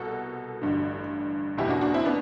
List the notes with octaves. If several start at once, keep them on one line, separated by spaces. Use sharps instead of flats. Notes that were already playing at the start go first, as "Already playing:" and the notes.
Already playing: C2 B2 F#4 A4
A1 G2 D3
F#1 E2 B2 E4 G4
D4 F#4
D4 F#4
C4 E4
B3 D4